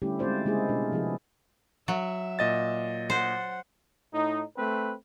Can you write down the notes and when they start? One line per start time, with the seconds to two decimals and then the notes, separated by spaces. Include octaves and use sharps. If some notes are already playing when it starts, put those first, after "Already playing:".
0.02 D3 G3 A3 C#4 E4 G4
0.19 G#3 C4 D#4 F4 C5 D5
0.45 C#3 G#3 A#3 E4 G#4
0.69 B2 D4 A#4
0.92 C3 F3 B3 E4 G#4
1.88 F#3 E5
2.39 A#2 D#5 A6
3.10 C5 F#5
4.13 A2 D#4
4.58 A3 C4 B4